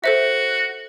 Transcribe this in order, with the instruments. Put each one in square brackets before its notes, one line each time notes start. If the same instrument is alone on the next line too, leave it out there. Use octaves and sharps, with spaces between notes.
[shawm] F#4 [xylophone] A4 C5 E5